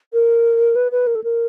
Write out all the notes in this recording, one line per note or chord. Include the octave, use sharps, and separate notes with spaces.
A#4
B4
B4
A#4
A4
A#4